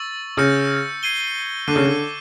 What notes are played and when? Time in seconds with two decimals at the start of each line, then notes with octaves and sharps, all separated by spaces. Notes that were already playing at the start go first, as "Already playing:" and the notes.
Already playing: C#6 E6 A6
0.37 C#3 G6 A#6 C#7
1.03 G#6 C7 D#7 G7
1.68 D3 D6 G6 C7 D#7
1.76 C#3
1.85 D3